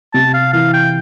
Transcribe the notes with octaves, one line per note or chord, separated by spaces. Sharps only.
C3 A5
F5
E3 F5
G5